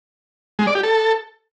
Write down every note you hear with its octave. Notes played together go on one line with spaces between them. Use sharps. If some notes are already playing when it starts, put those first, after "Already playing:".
G#3
D5
G4
A4